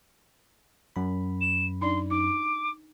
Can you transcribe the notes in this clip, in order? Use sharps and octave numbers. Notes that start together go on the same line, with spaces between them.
F#2 B5
E7
D4 D#4 D5 C6
D#4 D6